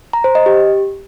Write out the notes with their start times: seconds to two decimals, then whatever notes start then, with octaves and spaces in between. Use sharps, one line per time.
0.13 A#5
0.24 C5
0.35 D#5
0.46 G4